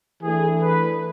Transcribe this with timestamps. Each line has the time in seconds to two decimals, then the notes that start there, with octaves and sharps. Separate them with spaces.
0.22 E3 A3 D4 G#4
0.61 B4